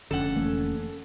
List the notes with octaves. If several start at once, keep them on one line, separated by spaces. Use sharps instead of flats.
F1 F2 D3 C#4 A4 F#5
E3 A3 A#3